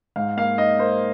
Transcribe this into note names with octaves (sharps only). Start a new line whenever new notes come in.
G#2 F5
A#3 F5
D#4 D#5
A#3 C5